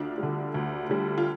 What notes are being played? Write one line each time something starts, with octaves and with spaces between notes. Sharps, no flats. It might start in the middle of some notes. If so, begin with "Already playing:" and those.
Already playing: D2 D4 F4
D3 G3
D2
D3 G3
F4